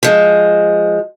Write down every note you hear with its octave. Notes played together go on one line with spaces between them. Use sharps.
F3 G#3